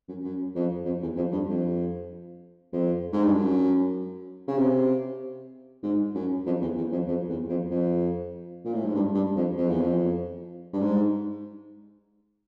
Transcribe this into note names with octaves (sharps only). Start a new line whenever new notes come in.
F#2
F#2
F2
F2
E2
F2
G2
F2
F2
G#2
G2
F#2
C#3
C3
G#2
F#2
F2
E2
E2
F2
F2
E2
F2
F2
A#2
A2
G#2
G2
G2
F2
F2
E2
F2
G2
G#2